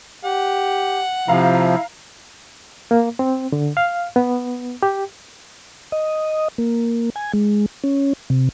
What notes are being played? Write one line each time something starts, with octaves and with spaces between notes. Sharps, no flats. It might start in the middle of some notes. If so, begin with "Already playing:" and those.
G4 F#5
C3 F3 E4 F5 A#5
A#3
C4
D3
F5
B3
G4
D#5
A#3
G#5
G#3
C#4
C3